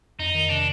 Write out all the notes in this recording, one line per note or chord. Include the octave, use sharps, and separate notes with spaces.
F2 D#4
D#3
C3 D4